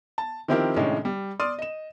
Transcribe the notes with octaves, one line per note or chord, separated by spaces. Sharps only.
A5
D#3 F3 C4 E4 G4 A#4
A2 C3 D#3 G#3 C#4 D4
G3
D5 C6 D#6 F6 D#7
D#5 E7